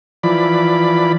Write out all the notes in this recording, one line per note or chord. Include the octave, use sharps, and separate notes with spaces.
E3 F3 D5 B5